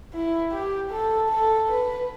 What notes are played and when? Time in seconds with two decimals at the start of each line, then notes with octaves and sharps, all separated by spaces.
0.14 E4
0.53 G4
0.91 A4
1.29 A4
1.68 B4